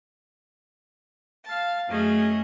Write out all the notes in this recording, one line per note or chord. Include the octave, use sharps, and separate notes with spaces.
F5 A5
F#2 A3 C#4 G#4 D#5